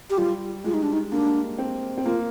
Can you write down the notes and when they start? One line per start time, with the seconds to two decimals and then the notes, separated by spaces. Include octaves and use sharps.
0.10 G4
0.18 G3 F4
0.64 G#3 F4
0.74 D#4
0.83 D4
0.93 D#4
1.12 A#3 D4
1.58 C4
1.98 C4
2.05 A#3 F4